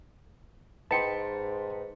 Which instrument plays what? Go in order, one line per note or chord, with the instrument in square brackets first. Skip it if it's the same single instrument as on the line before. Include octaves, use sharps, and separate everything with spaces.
[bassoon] G#2 [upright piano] D#4 G5 C6 [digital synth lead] B4 [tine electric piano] A5 C#7